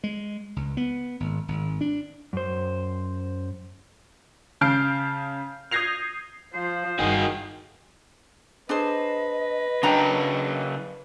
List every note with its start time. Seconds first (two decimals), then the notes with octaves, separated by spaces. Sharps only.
0.04 G#3
0.56 C#2
0.77 B3
1.20 G#1
1.48 G#1
1.81 D4
2.33 F#2 C5
4.61 C#3 A5 F6 G6 C7 D7
5.71 D#6 G6 G#6 A#6 C7 F7
6.54 F3 C5
6.99 G1 D#3 G3 F#4 G#4
8.69 D4 G#4 B4 C5 D#5
9.83 C#3 F#3 D4 G5 A#5